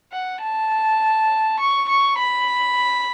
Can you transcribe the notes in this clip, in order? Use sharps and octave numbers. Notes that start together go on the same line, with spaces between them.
F#5
A5
C#6
C#6
B5